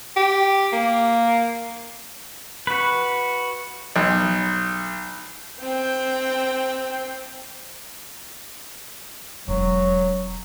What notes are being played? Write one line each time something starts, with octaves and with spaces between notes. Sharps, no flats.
G4
A#3
F#4 B4
B1
C4 G5
E1 F#3 C#4